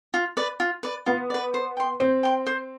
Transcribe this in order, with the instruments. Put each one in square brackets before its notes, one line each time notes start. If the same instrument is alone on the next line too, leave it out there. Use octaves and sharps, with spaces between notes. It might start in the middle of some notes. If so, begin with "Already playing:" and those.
[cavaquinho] F4
B4 D5
F4
B4 D5
[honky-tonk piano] B3 [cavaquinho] F4
[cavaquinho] B4 D5
C5
G5 C6
[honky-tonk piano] C4 [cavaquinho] C5
[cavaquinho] G5 C6
C5